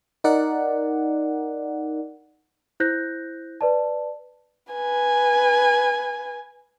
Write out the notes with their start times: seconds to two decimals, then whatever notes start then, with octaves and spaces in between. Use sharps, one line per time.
0.24 D#4 A#4 D5 F#5
2.80 E4 C5 F#6 G6 A#6
3.61 B4 D5 A5
4.73 B4 G#5